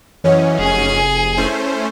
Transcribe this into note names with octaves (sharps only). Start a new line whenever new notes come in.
F#2 E3 C#4 C#5 D#5 F#5
F1 G#4 G#5
A3 C#4 E4 C5